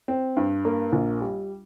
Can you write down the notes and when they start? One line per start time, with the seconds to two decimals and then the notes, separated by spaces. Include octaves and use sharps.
0.08 C4
0.37 G2
0.65 A#3
0.92 A#1
1.21 G3